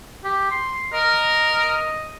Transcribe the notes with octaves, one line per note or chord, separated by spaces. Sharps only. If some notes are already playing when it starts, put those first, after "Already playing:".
G4
C6
A#4 D#5